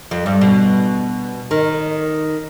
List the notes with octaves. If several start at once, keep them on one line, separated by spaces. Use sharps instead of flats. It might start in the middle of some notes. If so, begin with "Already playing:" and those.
F2
G2
B2
D#3